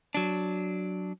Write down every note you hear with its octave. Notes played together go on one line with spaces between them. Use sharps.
F#3 D4